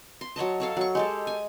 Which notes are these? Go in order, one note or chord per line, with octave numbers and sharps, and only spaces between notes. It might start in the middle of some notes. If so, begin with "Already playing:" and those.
C6
F#3 C#5 D#5 A5
A4 C#5 F5
F#3 C#6
G#3 G4 A4
G#5